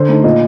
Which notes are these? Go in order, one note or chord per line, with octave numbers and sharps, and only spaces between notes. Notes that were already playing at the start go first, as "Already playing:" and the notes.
Already playing: D3 C5
A3 D#4
A#2 D#5